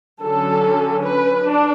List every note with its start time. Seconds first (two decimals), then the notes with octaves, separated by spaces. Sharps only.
0.22 D3 F#3 C#4 A4
1.03 B4
1.44 D4